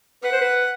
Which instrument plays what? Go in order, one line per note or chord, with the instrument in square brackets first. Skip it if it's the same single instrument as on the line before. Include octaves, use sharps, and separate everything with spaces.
[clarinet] B4 [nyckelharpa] F#5
[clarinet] C5
B4